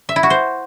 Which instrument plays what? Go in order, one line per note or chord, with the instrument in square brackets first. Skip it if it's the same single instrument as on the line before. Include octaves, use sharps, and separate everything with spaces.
[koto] E5
E4
F#4
C5